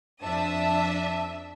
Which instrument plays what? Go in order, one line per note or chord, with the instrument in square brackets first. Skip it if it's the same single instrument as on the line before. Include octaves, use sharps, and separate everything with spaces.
[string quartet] F2 A5 D#6 [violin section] D4 E5